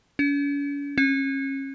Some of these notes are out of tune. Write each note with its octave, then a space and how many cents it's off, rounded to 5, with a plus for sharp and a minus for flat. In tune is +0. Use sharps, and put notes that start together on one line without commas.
C#4 +45
C#4 -30